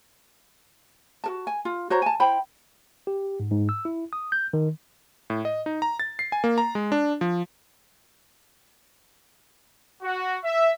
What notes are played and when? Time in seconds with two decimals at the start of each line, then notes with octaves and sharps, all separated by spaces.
1.24 F#4 A#4 A5
1.47 G#5
1.65 F4
1.90 F#4 C5 C#5 A#5
2.02 G#5 A5
2.20 E4 C5 G5 B5
3.07 G4
3.40 G#2
3.51 G#2
3.69 E6
3.85 E4
4.13 D#6
4.32 G6
4.53 D#3
5.30 A2
5.45 D#5
5.66 D#4
5.82 A#5
6.00 A6
6.19 C7
6.32 G#5
6.44 A#3
6.58 A#5
6.75 G#3
6.92 D4
7.21 F3
10.02 F#4
10.44 E5